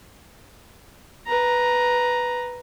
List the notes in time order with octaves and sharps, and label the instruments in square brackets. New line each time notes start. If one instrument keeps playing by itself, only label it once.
[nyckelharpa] B4 A#5